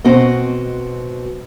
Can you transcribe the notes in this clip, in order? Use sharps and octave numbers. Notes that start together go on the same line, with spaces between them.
B2 C4 F#4 D#5